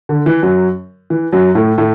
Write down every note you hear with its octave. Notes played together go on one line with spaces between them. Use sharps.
D3
E3
F#2 F#3
E3
F#2 F#3
A2 A3
A2 A3